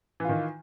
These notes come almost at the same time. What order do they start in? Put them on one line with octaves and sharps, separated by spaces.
E3 F4 D#3